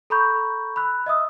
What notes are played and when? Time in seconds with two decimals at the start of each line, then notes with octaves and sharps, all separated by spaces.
0.10 A4 A#5 B5 C#6 G6
0.76 B5 E6 F#6
1.06 D#5 E5 D#6 E6